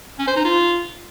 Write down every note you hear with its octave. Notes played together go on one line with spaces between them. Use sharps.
C#4
C5
D#4
F4